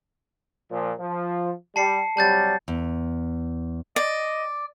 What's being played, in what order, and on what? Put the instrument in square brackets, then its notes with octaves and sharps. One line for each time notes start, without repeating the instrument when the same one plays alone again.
[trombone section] A#2 F3
F3
[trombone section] G3 [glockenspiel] A5 C7 C#7
[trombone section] C3 F#3 G3 [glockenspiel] A5 G6 A6
[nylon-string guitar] E2
[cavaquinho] D5 [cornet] D#5